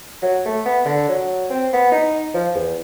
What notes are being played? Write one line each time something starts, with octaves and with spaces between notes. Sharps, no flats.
F#3
A3
B3
D3
F#3
C4
B3
D#4
F3
E2